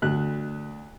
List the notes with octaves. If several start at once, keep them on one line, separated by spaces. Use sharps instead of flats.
D2 F#6